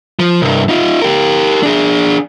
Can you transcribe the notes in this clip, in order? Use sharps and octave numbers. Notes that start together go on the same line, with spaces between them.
F3
C2 G2
D#4 F4
G4 A#4
D4 G#4